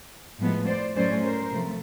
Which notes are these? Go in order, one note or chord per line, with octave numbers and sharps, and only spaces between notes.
A2 F3 G#3 B3
C5 D5
A2 F#3 A3 C#4 C5 D5
A#4 C5
C3 F3 A3